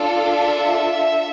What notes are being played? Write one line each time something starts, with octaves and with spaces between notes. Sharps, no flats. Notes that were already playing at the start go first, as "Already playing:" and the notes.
Already playing: D4 F4 A4
E5